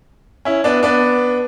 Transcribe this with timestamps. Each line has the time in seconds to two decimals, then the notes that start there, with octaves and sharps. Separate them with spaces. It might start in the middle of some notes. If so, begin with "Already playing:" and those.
0.45 C#4 E4
0.64 B3 D4
0.83 B3 D4